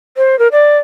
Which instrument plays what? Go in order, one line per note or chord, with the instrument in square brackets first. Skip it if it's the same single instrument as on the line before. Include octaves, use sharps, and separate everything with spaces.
[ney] C5
A#4
D5